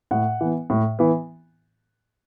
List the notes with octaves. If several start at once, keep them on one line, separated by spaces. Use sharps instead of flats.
A2 F#5
E3 B3
A2
E3 B3